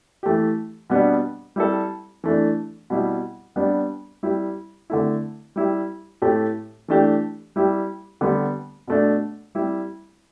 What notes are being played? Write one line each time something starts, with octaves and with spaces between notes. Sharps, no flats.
E3 A3 G4
B2 G3 B3 D4
G3 E4 A4
E3 A3 D4
B2 G3 E4
G3 B3 D4
G3 E4 G4
D3 A3 E4
G3 E4 G4
A2 A3 G4
E3 A3 D4 G4
G3 E4 G4
D3 G3 B3
B2 A3 D4
G3 E4 G4